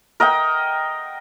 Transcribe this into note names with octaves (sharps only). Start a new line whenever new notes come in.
A#4 D#5 F#5 G5